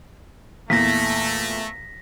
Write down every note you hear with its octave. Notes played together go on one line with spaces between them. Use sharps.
E2 A#2 E3 A3 A#6 B6